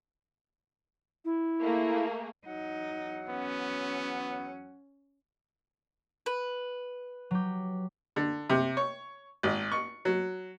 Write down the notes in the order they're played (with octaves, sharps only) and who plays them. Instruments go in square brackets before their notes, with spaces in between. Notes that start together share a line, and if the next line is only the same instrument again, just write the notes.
[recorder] E4
[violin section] A3 A#3 G#4
[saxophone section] E2 F#3 F#5 [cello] D#4
[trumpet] B3 [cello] C#4
[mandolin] B4
[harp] F#3 G4
[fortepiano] D3
C3
C#5
G#1
C#6
F#3